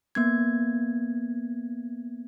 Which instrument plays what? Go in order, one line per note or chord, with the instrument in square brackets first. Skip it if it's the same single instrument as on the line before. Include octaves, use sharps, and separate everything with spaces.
[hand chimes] A#3 B3 G#6